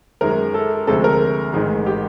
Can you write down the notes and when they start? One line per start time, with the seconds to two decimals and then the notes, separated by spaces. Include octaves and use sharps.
0.21 F#2 D#3 G#3 A#4
0.54 A4
0.87 D2 C3 F3 G#3 A4
1.04 A#4
1.53 A1 G#2 D#3 G#3
1.86 G4